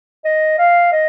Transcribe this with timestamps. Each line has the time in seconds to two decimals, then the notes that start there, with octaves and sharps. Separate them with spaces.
0.25 D#5
0.59 F5
0.92 D#5